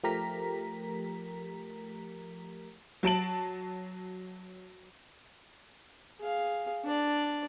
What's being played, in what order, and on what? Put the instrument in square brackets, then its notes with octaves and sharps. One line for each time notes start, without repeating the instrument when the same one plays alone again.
[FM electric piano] F3 A3 G4 A#4 A#5 B6
[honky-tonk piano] F#3 A5 D7 F#7
[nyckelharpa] G#4 F5
D4 D5